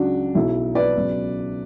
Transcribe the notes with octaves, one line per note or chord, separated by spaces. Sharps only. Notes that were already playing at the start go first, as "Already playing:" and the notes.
Already playing: C#2 C#3 F#3 D4 F#4
B1 B2 F#3 E4
B4 D5
C#2 B2 F#3